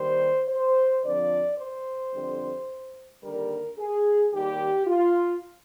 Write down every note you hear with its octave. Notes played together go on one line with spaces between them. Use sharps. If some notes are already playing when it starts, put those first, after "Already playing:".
Already playing: D#2 D#3 G3 C5
C5
F2 D3 F3 D5
C5
F2 D3 G3
D#2 D3 G3 A#4
G#4
D#2 D#3 G3 G4
F4